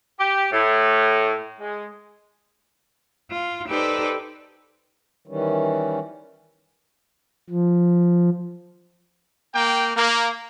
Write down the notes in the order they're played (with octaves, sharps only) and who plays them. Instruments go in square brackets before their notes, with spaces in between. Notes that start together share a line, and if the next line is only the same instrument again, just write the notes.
[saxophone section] G4
A2
G#3
[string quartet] F4
D#4 G4 A4 B4 C5 D5
[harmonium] D#3 E3 G3 C#4
[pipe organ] F3
[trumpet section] A#3 G5
A#3